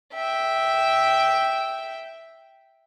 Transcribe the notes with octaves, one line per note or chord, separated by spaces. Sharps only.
E5 G5